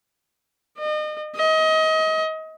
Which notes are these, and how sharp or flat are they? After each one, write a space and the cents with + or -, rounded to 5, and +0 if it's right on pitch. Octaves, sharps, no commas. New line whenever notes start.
D#5 -35
D#5 +30